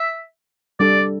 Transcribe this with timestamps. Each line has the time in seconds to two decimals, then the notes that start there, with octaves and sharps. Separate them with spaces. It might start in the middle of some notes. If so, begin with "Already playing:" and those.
Already playing: E5
0.80 G3 D4 A4 D5